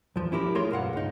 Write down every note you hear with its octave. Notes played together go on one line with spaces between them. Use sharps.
E2 F3
C#4 E4 G4 A#4
A3 F4 G#4 A#4 C#5 C6
B1 G2 F5 F#5
C#2 D#4